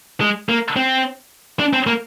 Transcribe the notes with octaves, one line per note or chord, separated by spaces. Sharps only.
G#3
A#3
C4
D4
C4
A#3